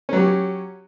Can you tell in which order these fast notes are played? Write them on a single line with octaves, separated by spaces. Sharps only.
C#4 F#3 G4